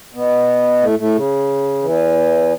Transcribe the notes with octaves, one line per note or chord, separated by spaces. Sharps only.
B2 B3
A2 A3
A2 A3
C#3
E2 E3